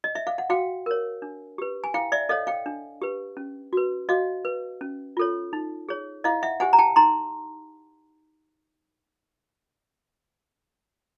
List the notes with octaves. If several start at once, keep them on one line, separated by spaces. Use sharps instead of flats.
D#5
E5
F5
F#5
F#4 F5 G5
A#4 C#5
D4
G4 B4
G#5
E4 F5 G5
D5 E5
A4 C#5 D#5 F5
F5 G5
D4
G4 B4
C#4
F#4 B4
F#4 D#5 F5
B4
C#4
F4 A4 C#5
D#4
G#4 C#5
E4 D#5 F5
E5 F#5
G4 C5 F#5 G#5
A#5
G5 A5
D#4 A#5 C6